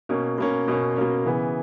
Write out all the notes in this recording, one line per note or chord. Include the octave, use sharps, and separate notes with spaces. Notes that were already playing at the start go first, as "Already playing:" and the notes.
B2 A#3 C#4
B2 A#3 C#4
B2 A#3 C#4
B2 A#3 C#4
C#3 E3 B3